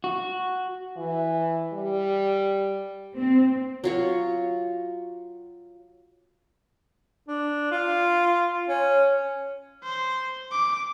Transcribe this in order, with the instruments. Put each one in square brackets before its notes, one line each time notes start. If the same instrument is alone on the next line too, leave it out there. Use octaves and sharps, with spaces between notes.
[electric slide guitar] F#4
[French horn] E3
G3
[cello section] C4
[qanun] F#3 F4 C#5
[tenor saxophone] D4
F4
C#4
[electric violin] C5
D6